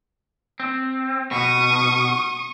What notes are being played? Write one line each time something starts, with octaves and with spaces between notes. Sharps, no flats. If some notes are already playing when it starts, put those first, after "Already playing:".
C4
B2 C#6 D#6